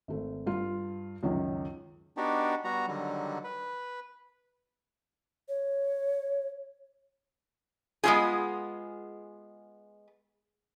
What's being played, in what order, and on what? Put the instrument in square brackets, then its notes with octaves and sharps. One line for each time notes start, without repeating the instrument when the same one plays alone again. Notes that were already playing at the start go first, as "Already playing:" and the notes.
[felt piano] G#1 A3
G2 F4
C#2 F#2 D#3
[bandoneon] B3 D4 D#4 F#4 G4
G3 B3 F#4 A#5
D3 D#3 F#3 G3
B4
[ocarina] C#5
[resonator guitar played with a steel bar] G#3 B3 C4 F4 G#4